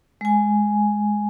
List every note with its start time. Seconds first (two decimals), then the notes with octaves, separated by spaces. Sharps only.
0.21 G#3 G#5